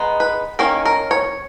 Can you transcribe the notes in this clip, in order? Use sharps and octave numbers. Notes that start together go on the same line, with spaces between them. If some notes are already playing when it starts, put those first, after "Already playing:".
Already playing: G#3 B3 D#4
B4
D#3 A#3 C#4 A#4
A#4
C#5